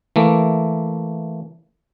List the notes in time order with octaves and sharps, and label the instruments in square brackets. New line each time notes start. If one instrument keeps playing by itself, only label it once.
[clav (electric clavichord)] E3 A3 A#3